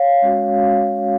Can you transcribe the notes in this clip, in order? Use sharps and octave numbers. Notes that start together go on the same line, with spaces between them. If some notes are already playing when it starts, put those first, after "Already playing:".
Already playing: C#5 F5
G#3 C#4 F#4